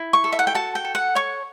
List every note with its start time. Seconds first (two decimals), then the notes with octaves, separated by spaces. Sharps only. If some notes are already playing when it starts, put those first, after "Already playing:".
Already playing: E4
0.13 C#6
0.24 A4
0.32 E5
0.39 F#5
0.47 G5
0.55 F#4 A5
0.75 G5
0.85 A4
0.95 F#5
1.15 C#5 C#6